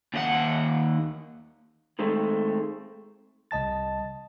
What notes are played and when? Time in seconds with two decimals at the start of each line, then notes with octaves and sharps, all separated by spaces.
0.14 D#2 F#5
1.99 D#3 G#3 A3 C4
3.51 C2 D#5 A5 A6